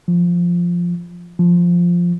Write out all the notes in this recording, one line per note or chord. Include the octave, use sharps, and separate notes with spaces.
F3
F3